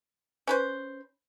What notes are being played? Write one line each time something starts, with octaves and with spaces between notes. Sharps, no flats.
C#4 B4 C5